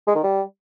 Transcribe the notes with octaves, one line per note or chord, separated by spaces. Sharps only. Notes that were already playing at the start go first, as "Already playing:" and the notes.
G#3
D#3
G3